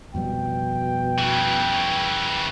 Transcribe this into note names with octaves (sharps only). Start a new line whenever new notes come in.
F2 B2 F3 G3 G5
C#3 E3